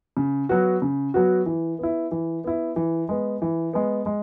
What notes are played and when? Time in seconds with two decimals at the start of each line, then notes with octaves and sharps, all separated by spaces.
0.17 C#3
0.49 F#3 B3 F#4
0.82 C#3
1.14 F#3 B3 F#4
1.46 E3
1.79 B3 E4
2.11 E3
2.44 B3 E4
2.76 E3
3.09 G#3 B3
3.42 E3
3.73 G#3 B3
4.06 G#3